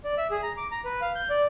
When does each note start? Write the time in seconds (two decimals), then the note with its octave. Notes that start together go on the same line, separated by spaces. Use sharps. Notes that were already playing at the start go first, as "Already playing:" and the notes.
0.04 D5
0.18 E5
0.31 G#4
0.43 A#5
0.57 D6
0.71 A#5
0.85 B4
1.01 F5
1.15 G6
1.30 D5